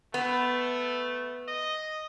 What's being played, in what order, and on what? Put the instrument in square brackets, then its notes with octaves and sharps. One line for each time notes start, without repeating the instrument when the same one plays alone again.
[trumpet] A3 [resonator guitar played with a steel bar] B3
[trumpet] D#5